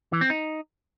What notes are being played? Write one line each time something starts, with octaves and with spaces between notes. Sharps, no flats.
E3
C4
D#4